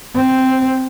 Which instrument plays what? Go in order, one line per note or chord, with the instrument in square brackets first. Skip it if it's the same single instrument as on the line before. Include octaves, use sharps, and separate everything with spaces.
[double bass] C4